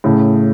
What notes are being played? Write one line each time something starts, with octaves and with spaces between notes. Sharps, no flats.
A2 C#3